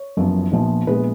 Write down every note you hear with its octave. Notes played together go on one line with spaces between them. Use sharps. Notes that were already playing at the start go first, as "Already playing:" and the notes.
Already playing: C#5
F#1 F#2 F3 B3
A#1 A#2 F3 B3
A#1 A#2 G#3 B3 B4